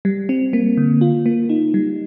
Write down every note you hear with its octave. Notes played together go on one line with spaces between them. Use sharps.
G3
C4
A#3
D3
F4
A#3
D#4
G3